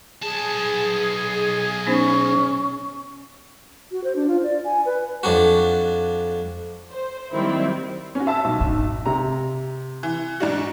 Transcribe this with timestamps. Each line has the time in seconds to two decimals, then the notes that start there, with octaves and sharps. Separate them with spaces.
0.22 B1 G#4 A5
1.87 B3 C#4 D#4 C5
3.92 F#4
4.04 C5
4.16 D4
4.28 F4
4.43 D5
4.64 G#5
4.86 B4
5.23 F2 D4 F#4
6.91 C5
7.32 D#3 F#3 G3 A#3 C4 E4
8.15 C#4 F#4
8.27 E5 A5 E6
8.44 B1
8.59 G#1 D4
9.06 C3 A#5
10.03 E3
10.40 G#2 D4 F#4